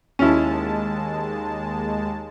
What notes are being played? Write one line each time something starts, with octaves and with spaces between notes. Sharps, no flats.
D#2 G#3 C#4 E4 A5